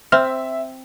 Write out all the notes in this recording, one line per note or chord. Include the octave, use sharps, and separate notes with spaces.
C4 E5 F6